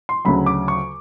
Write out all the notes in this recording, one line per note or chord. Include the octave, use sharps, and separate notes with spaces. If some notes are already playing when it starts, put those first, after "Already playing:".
C6
D2 C#3 F#3 B5
D6
C#6